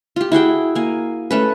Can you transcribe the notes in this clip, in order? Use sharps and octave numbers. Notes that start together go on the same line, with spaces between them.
F4 G4
E4 F#4 G#4 G5
A#3 G#5
A3 C#4 B4